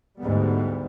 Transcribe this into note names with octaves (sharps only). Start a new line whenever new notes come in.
D2 G#2 G3 B3